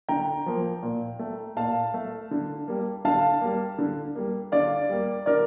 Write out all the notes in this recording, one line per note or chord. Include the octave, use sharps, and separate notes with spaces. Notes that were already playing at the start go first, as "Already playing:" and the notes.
D3 G5 A#5
F3 A#3
A#2
A3
A#2 F5 A5
A3
D3
G3 A#3
D3 F5 A5
G3 A#3
D3
G3 A#3
D3 D5 F5
G3 A#3
D3 A#4 D5